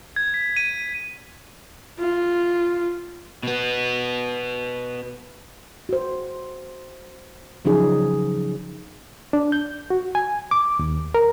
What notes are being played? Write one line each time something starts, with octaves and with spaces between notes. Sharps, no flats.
G#6
B6
D#7
F4
B2 B3
F#4 C5
C#3 F3 F#3 C#4 D#4 G#4
D4
G6
F#4
G#5
D6
D#2
A#4